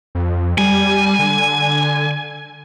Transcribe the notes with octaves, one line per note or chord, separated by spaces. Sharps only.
F2
G3 G#5
D3